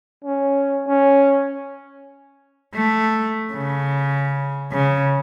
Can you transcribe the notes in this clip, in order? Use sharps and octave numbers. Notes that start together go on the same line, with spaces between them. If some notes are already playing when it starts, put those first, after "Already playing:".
C#4
C#4
A3
C#3
C#3